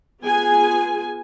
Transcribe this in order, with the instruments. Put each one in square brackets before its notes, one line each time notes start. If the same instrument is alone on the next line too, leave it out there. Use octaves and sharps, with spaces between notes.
[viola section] B3 F4 G#4 G#5